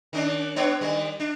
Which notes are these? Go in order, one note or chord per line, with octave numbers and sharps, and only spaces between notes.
D#3 C#4 D4
B3 D4 C#5
D#3 G3
D4